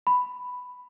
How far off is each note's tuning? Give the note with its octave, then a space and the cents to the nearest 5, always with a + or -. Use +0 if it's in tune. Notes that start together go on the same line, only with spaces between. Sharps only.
B5 +5